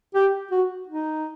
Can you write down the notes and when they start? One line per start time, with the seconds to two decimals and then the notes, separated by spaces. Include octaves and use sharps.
0.15 G4
0.51 F#4
0.87 D#4